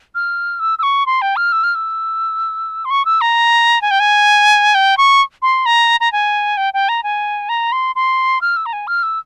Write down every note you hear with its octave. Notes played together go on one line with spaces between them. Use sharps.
F6
E6
E6
C#6
C6
G5
F6
E6
F6
E6
C6
C#6
E6
A#5
G#5
G5
G#5
G5
C#6
C6
A#5
A#5
G#5
G5
G5
A#5
G#5
A#5
C6
C6
F6
E6
A#5
G#5
F6
E6